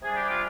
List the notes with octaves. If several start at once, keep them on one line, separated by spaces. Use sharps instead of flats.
C3 G3 D4 G#4
G4
F4